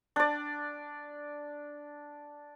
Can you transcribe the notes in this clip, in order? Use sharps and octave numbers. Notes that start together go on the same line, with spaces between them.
D4 D5